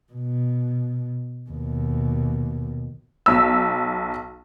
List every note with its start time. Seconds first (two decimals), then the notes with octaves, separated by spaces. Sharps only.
0.12 B2
1.50 D#2 B2
3.26 B1 E6